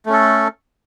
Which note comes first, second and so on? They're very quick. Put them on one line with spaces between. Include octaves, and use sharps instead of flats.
A3 C#4 A4